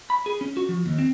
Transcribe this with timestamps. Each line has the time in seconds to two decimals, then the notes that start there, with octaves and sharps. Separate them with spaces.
0.10 B5
0.26 G#4
0.41 C#4
0.57 F#4
0.69 F3
0.86 D#2
0.99 C4